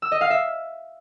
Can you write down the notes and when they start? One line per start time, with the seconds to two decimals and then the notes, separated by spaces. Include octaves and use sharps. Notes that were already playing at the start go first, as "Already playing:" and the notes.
0.02 E6
0.12 D#5
0.21 F5
0.30 E5